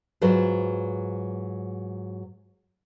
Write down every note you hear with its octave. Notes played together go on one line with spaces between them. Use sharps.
G#2 F#3 F4 B4 C5